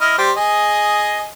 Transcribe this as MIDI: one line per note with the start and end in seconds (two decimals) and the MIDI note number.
0.01 0.13 64
0.01 0.13 75
0.01 0.13 89
0.18 0.32 55
0.18 0.32 67
0.18 0.32 72
0.37 1.27 68
0.37 1.27 75